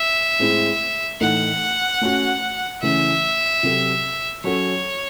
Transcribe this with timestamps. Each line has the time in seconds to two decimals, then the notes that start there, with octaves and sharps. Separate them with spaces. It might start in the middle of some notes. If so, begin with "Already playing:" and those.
Already playing: E5
0.39 A2 G#3 C4 E4
1.20 A2 E3 A3 D#4 A4 F#5
2.01 A3 C#4 F#4
2.82 C#3 E3 A3 C#4 E5
3.63 C3 F#3 C4 F#4 A4
4.44 F#3 C#4 F#4 A4 C#5